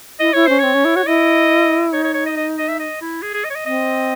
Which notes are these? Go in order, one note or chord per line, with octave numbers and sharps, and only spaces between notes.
E4 D#5
E4 C#5
C#4 C5
C4 C#5
C#4
E4
F#4 C#5
E4 D#5
D#4 C#5
C#5
C#5
D#5
D#5
D#5
E5
D#5
E4
G#4
G#4
D#5
C#5
D#5
C4 D#5